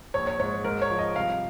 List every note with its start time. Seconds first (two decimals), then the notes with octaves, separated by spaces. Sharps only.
0.14 A#1 C#5
0.27 C#5
0.40 G#2 C#5
0.64 G#2 A#4
0.82 C#5
0.90 F3
0.99 D#5
1.16 C2 F5